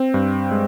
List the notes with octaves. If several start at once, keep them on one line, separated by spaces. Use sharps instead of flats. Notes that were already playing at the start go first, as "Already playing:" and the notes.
Already playing: C4
G2
G#3